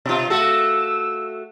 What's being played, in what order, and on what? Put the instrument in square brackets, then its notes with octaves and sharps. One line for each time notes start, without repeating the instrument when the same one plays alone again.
[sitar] B2 F4
[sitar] A3 F#4 A4 [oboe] E6